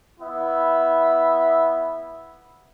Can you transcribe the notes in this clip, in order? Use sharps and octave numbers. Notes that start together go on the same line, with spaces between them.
B3 E4 E5